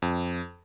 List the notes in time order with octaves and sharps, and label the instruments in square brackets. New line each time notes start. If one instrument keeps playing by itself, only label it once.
[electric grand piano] F2